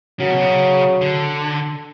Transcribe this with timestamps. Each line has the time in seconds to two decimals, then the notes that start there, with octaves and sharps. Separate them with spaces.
0.20 C#3 F#3
0.31 B2
0.41 C#3
1.01 D3